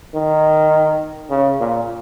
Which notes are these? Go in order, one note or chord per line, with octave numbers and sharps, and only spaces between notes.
D#3
C#3
A#2